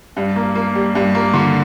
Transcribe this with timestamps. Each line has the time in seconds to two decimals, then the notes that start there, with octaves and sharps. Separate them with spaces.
0.16 G2
0.36 A#3
0.55 A#3
0.75 G3
0.95 G2
1.15 A#3
1.34 D3